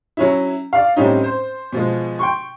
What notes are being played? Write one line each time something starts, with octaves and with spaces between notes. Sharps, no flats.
F#3 C#4 E4
D5 F5
A2 G3 C4 C#4 D#4
C5
B2 F3 G#3
G5 C6 C#6